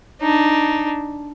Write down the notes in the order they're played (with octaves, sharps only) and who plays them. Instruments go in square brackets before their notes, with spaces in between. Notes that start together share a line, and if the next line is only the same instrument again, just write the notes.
[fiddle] D4 D#4